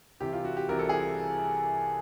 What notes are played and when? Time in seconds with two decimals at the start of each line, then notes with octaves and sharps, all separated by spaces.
0.20 C2 C3 E3 G4
0.33 F4
0.45 F#4
0.57 G4
0.69 C2 C3 E3 A#4
0.79 A4
0.89 G#4